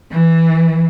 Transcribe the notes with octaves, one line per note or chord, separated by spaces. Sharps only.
E3